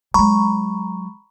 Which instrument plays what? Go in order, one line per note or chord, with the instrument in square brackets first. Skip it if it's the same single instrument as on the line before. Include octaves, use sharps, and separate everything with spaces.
[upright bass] F#3 G#3 [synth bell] A#5 B5 C#6